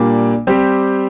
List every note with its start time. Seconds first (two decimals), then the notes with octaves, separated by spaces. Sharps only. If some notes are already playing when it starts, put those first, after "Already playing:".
Already playing: A#2 G3 A#3 D4
0.47 G3 C4 G4